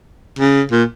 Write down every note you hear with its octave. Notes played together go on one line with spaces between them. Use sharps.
C#3
A#2